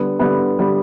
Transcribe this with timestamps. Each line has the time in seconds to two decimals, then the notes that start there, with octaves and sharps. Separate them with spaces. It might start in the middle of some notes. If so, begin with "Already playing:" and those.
Already playing: D3 G3 B3
0.19 D3 G3 B3
0.58 D3 G3 B3